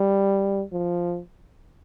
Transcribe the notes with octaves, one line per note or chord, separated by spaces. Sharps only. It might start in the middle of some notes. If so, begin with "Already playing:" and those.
Already playing: G3
F3